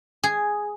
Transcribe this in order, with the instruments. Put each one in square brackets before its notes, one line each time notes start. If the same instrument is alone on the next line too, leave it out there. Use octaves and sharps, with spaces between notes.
[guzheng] G#4